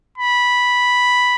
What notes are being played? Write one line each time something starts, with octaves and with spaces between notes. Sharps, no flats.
B5